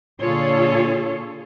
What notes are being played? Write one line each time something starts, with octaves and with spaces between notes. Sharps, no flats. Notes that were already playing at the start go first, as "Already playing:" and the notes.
A#2 D3 F4 G#4 A4 C#5